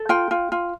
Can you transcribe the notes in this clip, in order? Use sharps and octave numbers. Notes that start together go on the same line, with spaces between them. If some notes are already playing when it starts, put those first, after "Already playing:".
Already playing: A4
F4 G5
F4
F4